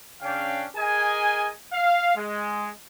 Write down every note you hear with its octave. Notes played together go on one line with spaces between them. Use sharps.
C#3 C#4 D4 F5 G5
G#4 A#4 D#5 G#5
F5
G#3